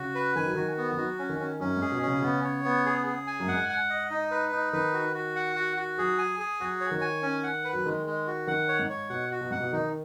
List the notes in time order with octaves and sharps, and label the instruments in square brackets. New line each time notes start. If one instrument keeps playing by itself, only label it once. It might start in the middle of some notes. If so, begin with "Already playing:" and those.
Already playing: [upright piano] C#3 [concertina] F#4
[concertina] B4
[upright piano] D#3 [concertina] G#5
[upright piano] F#3
[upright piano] D#3 [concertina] F#4
[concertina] B3
[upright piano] D#3
[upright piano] F#3 [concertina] F#4
[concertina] C#4
[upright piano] D#3
[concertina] C#4
[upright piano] F#2 [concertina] C#4
[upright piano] G#2
[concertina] G#4
[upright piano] B2
[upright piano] C#3 [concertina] C#4
[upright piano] B2
[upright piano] C#3 [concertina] B3
[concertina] C#5
B3
G#4
G#4
G#5
[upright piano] F#2
[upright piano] G#2 [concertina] F#5
[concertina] F#5
D#5
D#4
B4
D#4
[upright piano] D#3 [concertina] B4
[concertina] F#4
F#4
F#5
F#4
F#4
[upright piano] F#3 [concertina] G#4
[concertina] G#5
G#4
[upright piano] F#3 [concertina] F#4
[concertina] C#5
[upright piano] D#3
[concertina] G#5
C#4
F#5
B4
[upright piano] F#3
[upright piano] D#3 [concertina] G#3
[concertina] G#3
F#4
[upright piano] D#3 [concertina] F#5
[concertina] C#5
[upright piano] G#2
[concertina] C#5
[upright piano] B2 [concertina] F#5
[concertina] F#4
[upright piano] B2
[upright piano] G#2 [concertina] F#5
[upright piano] B2
[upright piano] D#3 [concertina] D#4